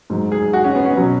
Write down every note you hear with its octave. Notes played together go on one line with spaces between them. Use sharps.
G#2 F#3
G#4
F#4
C#4
B3
C#4
B2 F#3